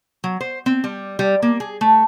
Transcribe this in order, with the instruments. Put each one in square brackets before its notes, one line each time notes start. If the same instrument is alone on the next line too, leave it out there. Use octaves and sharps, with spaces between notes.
[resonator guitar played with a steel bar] F#3
C5
C4
G3
G3
A#3
G#4
A3